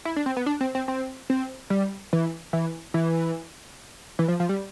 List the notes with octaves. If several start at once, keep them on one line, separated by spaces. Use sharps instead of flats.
E4
D4
C4
B3
D4
C4
C4
C4
C4
G3
E3
E3
E3
E3
F3
F3
G3